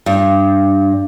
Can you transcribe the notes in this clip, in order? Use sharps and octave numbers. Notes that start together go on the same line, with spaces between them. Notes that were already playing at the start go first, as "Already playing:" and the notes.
G2